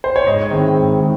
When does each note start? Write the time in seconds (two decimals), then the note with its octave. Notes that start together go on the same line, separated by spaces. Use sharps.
0.04 C5
0.16 C#5
0.27 G#2 D#5
0.51 D#3 G#3 C4 E4
0.75 G#2
1.00 D#3 G#3